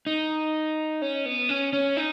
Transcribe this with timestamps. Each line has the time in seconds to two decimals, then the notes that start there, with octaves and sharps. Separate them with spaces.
0.06 D#4
1.02 C#4
1.26 B3
1.49 C#4
1.73 C#4
1.97 D#4